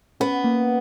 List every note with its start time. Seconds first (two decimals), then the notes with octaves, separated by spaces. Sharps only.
0.20 B3 C#4
0.44 A#3